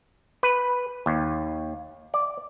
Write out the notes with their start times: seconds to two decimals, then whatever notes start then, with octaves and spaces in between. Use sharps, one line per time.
0.43 B4
1.06 D#2
2.14 D5